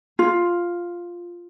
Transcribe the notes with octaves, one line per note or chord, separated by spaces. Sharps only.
F4